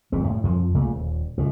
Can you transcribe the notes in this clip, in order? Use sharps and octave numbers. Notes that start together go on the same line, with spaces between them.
D1 F2 G#2 G#3
A2
F2 F3
C2 A#2 C#3 A3
D#1
C#2 A2